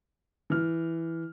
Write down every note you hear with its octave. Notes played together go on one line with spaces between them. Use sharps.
E3 F6